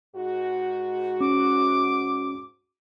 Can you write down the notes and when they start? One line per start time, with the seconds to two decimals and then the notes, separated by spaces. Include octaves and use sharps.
0.15 G#2 F#4
1.21 C#4 D6